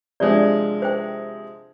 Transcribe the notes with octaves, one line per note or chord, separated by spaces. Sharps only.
C3 F3 G#3 D4 C#5 D5
C5 G5